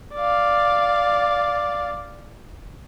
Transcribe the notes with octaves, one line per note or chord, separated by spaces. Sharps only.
D5 F5